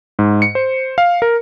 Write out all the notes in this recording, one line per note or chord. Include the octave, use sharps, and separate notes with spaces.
G#2
C#7
C5
F5
A#4